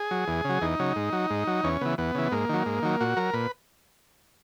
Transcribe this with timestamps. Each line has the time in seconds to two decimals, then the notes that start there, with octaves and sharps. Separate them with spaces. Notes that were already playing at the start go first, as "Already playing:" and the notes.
Already playing: G#4
0.11 F#3
0.28 E2
0.45 C#3 F#3
0.61 E2 D#4
0.79 C#3 F#3
0.96 G#2
1.13 F#3
1.30 G#2
1.47 F#3
1.64 E2 C#4
1.81 C#3 E3 B3
1.98 E2 B3
2.15 C#3 E3
2.32 G#2 A#3
2.49 D#3 F#3
2.66 G#2
2.82 D#3 F#3
3.01 A#2 F#4
3.17 F#3 A#4
3.33 A#2 B4